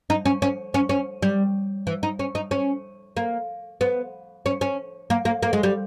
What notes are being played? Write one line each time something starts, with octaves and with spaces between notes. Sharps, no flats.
D#4
C#4
C#4
C#4
C#4
G3
E3
D#4
C#4
D#4
C#4
A#3
B3
C#4
C#4
A#3
A#3
A#3
G#3
G3